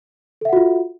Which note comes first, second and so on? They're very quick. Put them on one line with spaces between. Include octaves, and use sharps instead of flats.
A4 E5 F#5 F#4 F4